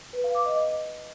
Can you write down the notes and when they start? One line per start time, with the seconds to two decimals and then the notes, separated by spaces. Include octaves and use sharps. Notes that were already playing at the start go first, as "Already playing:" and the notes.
0.13 B4
0.24 F5
0.35 D6
0.46 D#5
0.56 D#5